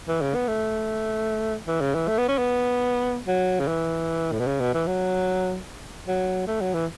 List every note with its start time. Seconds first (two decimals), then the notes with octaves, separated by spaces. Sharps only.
0.08 E3
0.21 C#3
0.35 B3
0.48 A3
1.68 E3
1.81 C#3
1.95 E3
2.08 A3
2.18 B3
2.28 C#4
2.38 B3
3.27 F#3
3.60 C#3
3.67 E3
4.32 A2
4.39 B2
4.47 C#3
4.61 B2
4.74 E3
4.87 F#3
6.07 F#3
6.47 A3
6.61 F#3
6.74 E3